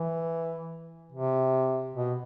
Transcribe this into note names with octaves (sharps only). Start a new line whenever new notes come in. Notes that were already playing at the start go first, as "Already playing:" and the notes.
Already playing: E3
C3
B2